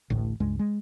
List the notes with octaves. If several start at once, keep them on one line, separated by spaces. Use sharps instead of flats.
A1 D2 A2
C#2 G2 G#3
G#3